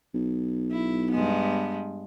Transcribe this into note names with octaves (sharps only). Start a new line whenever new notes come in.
B1
E4
G2 G#3 B3